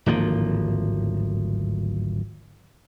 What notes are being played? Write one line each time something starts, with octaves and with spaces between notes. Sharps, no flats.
D1 G#1 F3 A#3